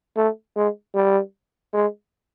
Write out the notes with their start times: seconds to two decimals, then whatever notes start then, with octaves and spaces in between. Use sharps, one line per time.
0.17 A3
0.56 G#3
0.95 G3
1.73 G#3